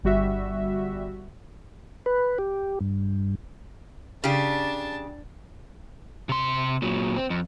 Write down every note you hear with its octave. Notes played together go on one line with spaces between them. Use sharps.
G1 G3 F#4 E5
B4
G4
G2
C#3 D4 G4 A5
C3 C6
A#2 F#3
C4
F2